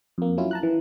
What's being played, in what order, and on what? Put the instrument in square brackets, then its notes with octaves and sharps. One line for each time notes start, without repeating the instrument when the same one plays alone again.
[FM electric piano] F2 A#3
F#3 C#4 E4 F4
A5 A#5 F#6
E3